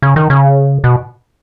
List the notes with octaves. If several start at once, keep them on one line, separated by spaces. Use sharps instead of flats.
C#3
D#3
C#3
B2